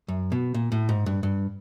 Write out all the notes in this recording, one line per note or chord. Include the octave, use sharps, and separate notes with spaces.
F#2
B2
A#2
A2
G#2
G2
G2